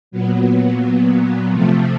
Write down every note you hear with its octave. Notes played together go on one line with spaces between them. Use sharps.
A#2 F#3 B3
C3 F3 A3